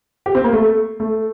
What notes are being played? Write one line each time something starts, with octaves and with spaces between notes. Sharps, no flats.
G4
C4
A#3
A3
A3